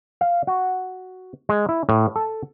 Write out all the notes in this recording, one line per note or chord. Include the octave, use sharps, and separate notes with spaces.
F5
F#4
G#3
E4
A2
A4